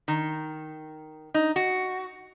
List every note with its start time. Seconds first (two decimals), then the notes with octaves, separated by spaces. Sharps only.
0.08 D#3
1.34 D#4
1.56 F#4